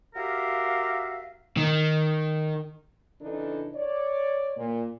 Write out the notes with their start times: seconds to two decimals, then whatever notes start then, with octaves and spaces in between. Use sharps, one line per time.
0.15 F#4 G4 A#4 E5 F5
1.57 D#3
3.21 C#3 E3 D4 D#4 A4
3.74 C#5 D5
4.56 A#2